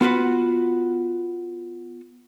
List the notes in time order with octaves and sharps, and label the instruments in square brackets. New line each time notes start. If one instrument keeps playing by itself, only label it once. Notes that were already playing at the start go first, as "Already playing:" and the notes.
[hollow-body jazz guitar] B3 F4 F#4 B4 F#5